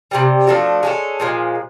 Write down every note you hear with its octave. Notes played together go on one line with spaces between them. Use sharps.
C3 E3 G3
F3 A3 D4 F#4
G#3 C#4 F#4 A4
A#2 F3 G#3